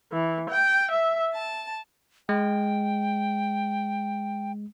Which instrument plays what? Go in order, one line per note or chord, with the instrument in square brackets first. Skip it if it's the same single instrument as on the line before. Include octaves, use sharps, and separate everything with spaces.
[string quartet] E3
G5
E5
A5
[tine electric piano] G#3 [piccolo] G5